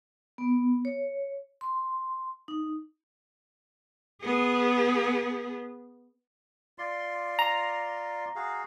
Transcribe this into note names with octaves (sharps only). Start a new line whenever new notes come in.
B3
C#5
C6
D#4
B3 G#4
F4 D5 C6
A#5
F#4 G#4 F5